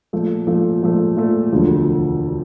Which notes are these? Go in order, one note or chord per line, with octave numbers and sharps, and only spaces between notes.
A#2 F3 A3
A#2 F3 A3
A#2 F3 A3
A#2 F3 A3
E1 D2 D3 F3 A3